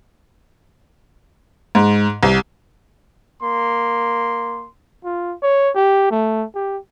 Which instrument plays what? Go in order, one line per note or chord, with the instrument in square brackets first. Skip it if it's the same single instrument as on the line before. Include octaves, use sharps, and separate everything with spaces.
[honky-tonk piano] G#2
C2
[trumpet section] A#3 C6
[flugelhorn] F4
C#5
G4
A3
G4